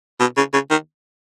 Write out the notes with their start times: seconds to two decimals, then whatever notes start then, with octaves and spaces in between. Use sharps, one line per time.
0.20 B2
0.37 C#3
0.53 C#3
0.71 D#3